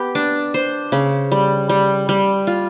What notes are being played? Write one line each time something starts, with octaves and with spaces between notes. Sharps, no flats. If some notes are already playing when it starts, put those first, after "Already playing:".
Already playing: B3 G4
D4
C5
C#3
G3
G3
G3
F4